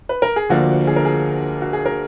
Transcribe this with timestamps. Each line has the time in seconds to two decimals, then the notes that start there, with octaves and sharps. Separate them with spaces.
0.09 B4
0.22 A#4
0.36 G#4
0.50 D2 D3 F3 A#3 D4 F#4
0.87 G#4
0.96 A#4
1.05 G#4
1.62 F#4
1.73 G#4
1.86 A#4